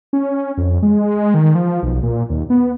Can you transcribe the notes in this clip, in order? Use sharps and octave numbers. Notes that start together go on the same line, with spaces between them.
C#4
F2
G#3
D#3
F3
B1
A#2
D#2
B3